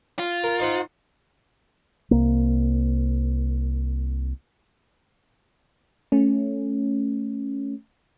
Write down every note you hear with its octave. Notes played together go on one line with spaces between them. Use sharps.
F4
A#4
D#4 C5 F#5
C2 A#3
A3 C#4